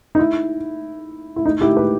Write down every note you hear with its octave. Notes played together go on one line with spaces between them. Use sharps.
D#4
E4
E4
D#4
E4 G4
G4 B4